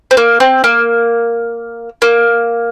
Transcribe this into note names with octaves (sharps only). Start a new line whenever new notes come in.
C4
A#3
C4
A#3
A#3